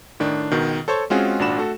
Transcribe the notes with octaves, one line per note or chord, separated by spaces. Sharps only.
A2 D#3 D4
C#2 B2 D#3
A4 C5 C#5 C#6
G#3 C4 C#4 F4 F#4 G#4
G#1 A#2 D4 F#4 B5 E7
A3 F#4 A4